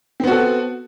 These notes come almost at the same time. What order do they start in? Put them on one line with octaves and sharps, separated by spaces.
C4 B3 F#4 A4